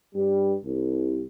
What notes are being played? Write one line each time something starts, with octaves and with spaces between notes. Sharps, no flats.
G2 G3
C2